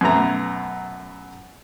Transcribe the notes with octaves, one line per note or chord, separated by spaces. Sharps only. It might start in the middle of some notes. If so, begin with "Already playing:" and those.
F#2 B2 A3 A#5